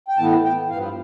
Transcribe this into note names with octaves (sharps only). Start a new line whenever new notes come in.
G5
A2 E3 B3 A5
G5
G2 F3 B3 F5